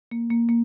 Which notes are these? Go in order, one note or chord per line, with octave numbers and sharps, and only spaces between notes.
A#3
A#3
A#3